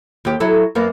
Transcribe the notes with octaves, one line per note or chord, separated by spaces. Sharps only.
D#2 G4
F#3 E4 A4
F#2 A#3 B3